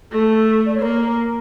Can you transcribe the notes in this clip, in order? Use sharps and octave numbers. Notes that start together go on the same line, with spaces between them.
A3 A4
D5
C#5
A#3 A#4